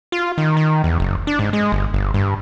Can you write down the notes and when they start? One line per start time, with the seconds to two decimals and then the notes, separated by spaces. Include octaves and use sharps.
0.12 F4
0.38 D#3
0.57 D#3
0.84 E2
1.00 F#1
1.27 D4
1.39 G#2
1.53 G#3
1.72 G1
1.94 G1
2.14 G2